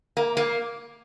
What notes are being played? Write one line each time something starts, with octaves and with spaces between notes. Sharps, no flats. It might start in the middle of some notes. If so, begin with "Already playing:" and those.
A#3
A#3